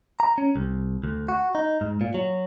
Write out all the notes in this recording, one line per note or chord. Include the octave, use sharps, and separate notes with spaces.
A#5
C#4
C2
D2
F#4
D#4
G#2
A#2
F#3